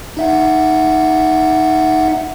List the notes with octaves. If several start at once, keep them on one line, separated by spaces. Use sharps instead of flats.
D#4 E5 F#5